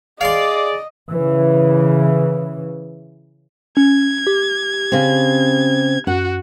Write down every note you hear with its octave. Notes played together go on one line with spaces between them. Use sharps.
G#4 D5 D#5 F5 C6
C#3 E3
C#4 G#6
G4
C#3 C4
F#2 F#4 F#5